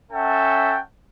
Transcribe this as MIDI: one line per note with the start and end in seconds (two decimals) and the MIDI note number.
0.12 0.78 61
0.12 0.78 69
0.12 0.78 76
0.12 0.78 78
0.12 0.78 79
0.12 0.78 81